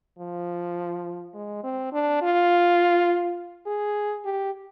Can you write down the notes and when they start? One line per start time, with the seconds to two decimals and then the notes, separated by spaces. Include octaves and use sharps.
0.19 F3
1.34 G#3
1.63 C4
1.92 D4
2.22 F4
3.66 G#4
4.25 G4